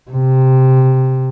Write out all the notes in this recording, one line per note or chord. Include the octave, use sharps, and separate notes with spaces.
C3